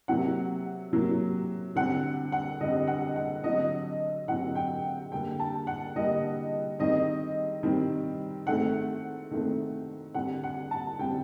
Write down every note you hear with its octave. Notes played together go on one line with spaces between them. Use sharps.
C3 F#3 A#3 F#5
C3 F#3 A#3
D3 G3 C4 F#5
F#5
D3 G3 C4 D#5
F#5
F#5
D3 F#3 C4 D#5
D3 F#3 C4 F#5
G5
D3 G3 A#3 G5
A5
F#5
D3 G3 A#3 D#5
D#3 G3 C4 D#5
D#3 G3 C4
D#3 A3 C4 F#5
D#3 A3 C4
D3 G3 C4 F#5
F#5
A5
D3 G3 C4 G5